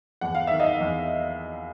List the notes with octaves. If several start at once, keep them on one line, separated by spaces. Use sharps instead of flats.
E2 F#5
F5
D#3 E5
D#5 F5
E2